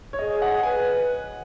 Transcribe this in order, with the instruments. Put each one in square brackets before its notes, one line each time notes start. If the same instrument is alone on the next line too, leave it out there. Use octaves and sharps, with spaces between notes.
[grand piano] C#5
[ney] G#4 [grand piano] D#5
[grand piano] F#5
[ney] B4 [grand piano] G#5